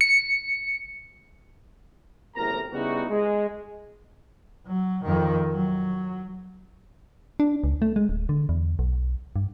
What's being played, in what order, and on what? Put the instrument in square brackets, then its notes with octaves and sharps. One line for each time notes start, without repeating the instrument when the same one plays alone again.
[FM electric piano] C#7
[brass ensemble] F#1 E2 A2 C3 A#4 A#5
C#3 G3 B3 D#4 E4 F#4
G#3
[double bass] F#3
F2 D#3
F#3
[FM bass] D4
C#2
A3
G#3
D1
D3
E2
B1
G2